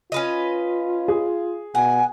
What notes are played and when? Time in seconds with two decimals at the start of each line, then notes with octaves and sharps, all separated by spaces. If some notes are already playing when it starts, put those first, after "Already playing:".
0.12 C#4 F4 B4 D#5
1.08 G#4
1.75 B2 F#5 G#5